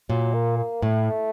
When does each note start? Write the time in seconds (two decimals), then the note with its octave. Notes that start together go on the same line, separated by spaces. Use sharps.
0.09 A#2 F#3
0.34 A#3
0.58 A#3
0.82 A2 A3